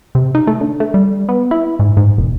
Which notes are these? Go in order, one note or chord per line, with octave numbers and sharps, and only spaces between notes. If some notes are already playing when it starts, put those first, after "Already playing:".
C3
D#4
A3
D3
A3
G3
B3
E4
G#2
G#2
E1